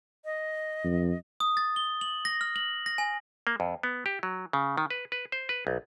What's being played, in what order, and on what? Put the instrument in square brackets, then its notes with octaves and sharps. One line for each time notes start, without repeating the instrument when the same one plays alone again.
[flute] D#5
[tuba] F2
[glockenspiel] D#6
A6
G7
F#7
A#6
F6
F#7
A#6
G#5
[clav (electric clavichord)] A#3
F2
B3
G4
F#3
C#3
D#3
B4
B4
C5
B4
B1